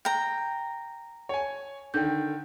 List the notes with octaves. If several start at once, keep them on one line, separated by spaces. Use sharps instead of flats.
G5 A#5
C#5 G#5
D3 D#3 G5 G6